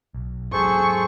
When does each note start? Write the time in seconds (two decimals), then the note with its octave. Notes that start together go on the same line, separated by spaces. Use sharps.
0.14 B1
0.53 G#2 F#3 G#4 A4 C5 C#6